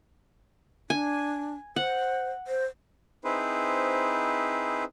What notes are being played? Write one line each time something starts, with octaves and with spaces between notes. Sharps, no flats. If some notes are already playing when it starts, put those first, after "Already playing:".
D4 G#5
C5 F#5
C5
C4 D#4 E4 G#4 B4 C5